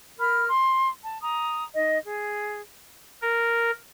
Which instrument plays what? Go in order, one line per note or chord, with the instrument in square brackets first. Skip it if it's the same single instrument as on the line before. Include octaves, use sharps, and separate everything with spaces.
[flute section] A#4 B5 F6
C6
A5
A#5 D#6
D#4 D#5
G#4
[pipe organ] A#4